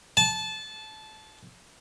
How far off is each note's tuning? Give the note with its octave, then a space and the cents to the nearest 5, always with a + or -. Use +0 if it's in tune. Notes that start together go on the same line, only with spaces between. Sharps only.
A5 -20